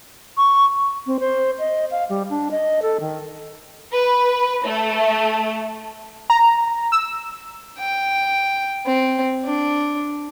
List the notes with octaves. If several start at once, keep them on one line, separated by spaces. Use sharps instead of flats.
C#6
C4
C5
D#5
F5
G3
D4
D#5
A4
D#3
B4
A3
A#5
E6
G5
C4
D4